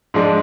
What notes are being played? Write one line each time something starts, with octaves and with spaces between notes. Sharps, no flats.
G#2 F3 G#3 D4